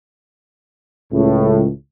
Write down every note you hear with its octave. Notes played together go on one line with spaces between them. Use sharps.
C#2 A2